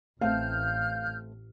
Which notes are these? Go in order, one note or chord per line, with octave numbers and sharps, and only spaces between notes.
A1 A3 C4 F5 A5 F6 G6